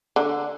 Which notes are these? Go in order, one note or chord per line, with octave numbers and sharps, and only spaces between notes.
D3